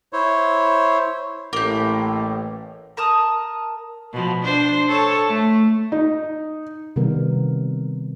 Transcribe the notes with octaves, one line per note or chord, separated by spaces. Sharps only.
E4 C5 C#5
A1 A2 A#3 G4
A#4 A5 D#6
B2 F3
D4 C5
A4 C#5
A3
D#4
C3 D#3 G3 B3 A#4